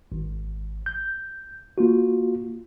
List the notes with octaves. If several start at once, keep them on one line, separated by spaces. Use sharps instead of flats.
G#1
G6
A#3 F4 F#4